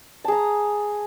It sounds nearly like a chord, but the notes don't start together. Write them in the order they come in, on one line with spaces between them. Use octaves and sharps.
A5 G#4 A#5